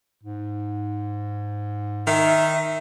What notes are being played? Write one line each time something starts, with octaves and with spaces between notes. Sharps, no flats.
G#2
D#3 E5